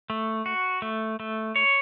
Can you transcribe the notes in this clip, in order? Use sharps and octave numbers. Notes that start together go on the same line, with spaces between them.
A3
F#4
A3
A3
C#5